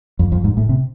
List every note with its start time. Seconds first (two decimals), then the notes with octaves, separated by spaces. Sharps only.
0.19 F2
0.32 F2
0.44 G#2
0.57 A2
0.69 C3